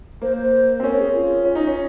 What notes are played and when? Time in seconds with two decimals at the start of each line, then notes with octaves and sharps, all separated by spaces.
0.22 A#3 C5
0.37 C5
0.80 C4
0.83 C#4 A#4
0.99 G#4
1.14 F4
1.45 C#4
1.55 D#4
1.67 C#4